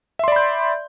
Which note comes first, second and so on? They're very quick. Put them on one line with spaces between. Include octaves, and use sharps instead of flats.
E5 C6 D5 B5 G6